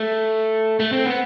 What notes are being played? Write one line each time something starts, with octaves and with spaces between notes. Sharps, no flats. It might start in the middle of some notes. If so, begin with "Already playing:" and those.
Already playing: A3
A3
C4
B3